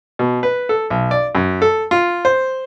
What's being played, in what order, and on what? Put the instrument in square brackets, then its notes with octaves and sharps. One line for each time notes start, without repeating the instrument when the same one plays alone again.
[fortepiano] B2
B4
A4
B1
D5
F#2
A4
F4
C5